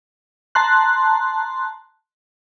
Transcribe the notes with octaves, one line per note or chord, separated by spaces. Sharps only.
A5 A#5 C6 F#6